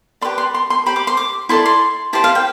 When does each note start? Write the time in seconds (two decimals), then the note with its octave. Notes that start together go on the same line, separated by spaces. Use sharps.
0.21 G4 B4 D5 C6
0.38 C6
0.54 C6
0.70 C6
0.86 G4 C5 B5
0.96 D6
1.07 C6
1.17 D6
1.49 E4 A4 D5 C6
1.66 C6
2.13 E4 G4 C5 A5
2.24 F5
2.35 G5